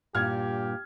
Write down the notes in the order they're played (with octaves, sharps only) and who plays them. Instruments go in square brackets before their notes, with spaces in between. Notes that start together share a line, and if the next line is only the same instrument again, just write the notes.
[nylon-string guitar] G2 A#2 [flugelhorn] G4 [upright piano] F6 G#6